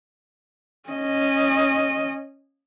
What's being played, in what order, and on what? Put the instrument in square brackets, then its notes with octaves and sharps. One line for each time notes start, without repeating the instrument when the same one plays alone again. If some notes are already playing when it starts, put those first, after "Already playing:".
[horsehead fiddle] C#4 D#5